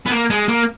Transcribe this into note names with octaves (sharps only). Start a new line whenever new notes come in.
B3
A#3
G#3
A#3